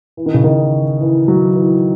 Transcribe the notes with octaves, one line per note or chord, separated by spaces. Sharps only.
E3
D#3
C#3
D#3
E3
F#3
E3